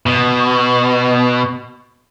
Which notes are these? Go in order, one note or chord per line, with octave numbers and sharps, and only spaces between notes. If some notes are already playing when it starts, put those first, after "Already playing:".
B2